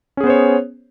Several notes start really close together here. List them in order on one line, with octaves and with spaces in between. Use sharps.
C#4 G#4 B3 C5 C#5